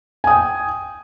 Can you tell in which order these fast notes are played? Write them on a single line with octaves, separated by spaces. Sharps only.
G#5 D#6 G5